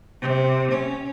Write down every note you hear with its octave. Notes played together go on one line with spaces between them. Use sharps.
C3
C#4